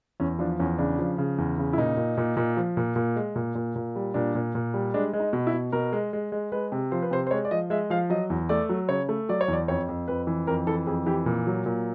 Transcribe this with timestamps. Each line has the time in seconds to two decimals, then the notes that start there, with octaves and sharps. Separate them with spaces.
0.20 E2 C#4
0.39 F3 D4
0.59 E2 C#4
0.78 C#3 D4
0.98 F3
1.18 C#3
1.38 E2
1.58 C#3
1.73 E4
1.78 A#2 D#4
1.97 A#2
2.17 A#2
2.37 A#2
2.57 F3
2.77 A#2
2.96 A#2
3.16 G#3
3.35 A#2
3.55 A#2
3.76 A#2
3.96 G3
4.14 A#2 D4
4.35 A#2
4.55 A#2
4.74 G3
4.94 G#3 D4
5.13 G#3
5.20 D#4
5.33 B2
5.47 E4
5.53 B2
5.72 B2 A#4
5.92 G#3
6.13 G#3
6.32 G#3
6.52 G#3 B4
6.72 C3
6.92 F3 C5
7.02 B4
7.11 C3 C5
7.27 C5
7.31 G#3 C#5
7.45 D5
7.51 F3 D#5
7.70 G#3 E5
7.90 F3 F5
8.10 F#3 D#5
8.30 E2
8.49 A3 D5
8.69 F#3
8.89 C#3 C#5
9.09 A3
9.29 F#3 D5
9.41 C#5
9.48 E2
9.53 D5
9.68 F2 C#5
9.89 F2
10.08 F2 B4
10.27 E3
10.47 F2 A#4
10.67 E3 A4
10.87 F2 G#4
11.06 E3 G4
11.26 A#2
11.47 F#3
11.66 A#2